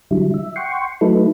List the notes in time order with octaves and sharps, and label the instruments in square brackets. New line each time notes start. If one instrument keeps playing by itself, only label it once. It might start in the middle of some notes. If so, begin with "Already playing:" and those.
[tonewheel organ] D3 F#3 G3 E4
E5
F#5 G5 C6 C#6
F#3 A3 D#4 E4 A4 B4